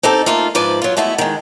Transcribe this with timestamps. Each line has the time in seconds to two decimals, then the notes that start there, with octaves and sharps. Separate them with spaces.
0.03 C4 D#4 G4 A4
0.26 A3 A#3 D#4 F4
0.55 G#2 F3 B4 D5
0.82 F#3 F4
0.97 G#3 A3 B3 E4 F#4
1.18 D#3 G#3